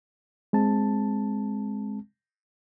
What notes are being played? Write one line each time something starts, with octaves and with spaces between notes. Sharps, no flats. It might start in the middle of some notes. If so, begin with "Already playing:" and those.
G#3 C4 A5